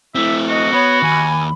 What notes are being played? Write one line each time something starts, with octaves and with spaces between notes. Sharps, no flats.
A3 C4 E4 E5
F#4 D#5
B3 C#5 B5
D#2 G#5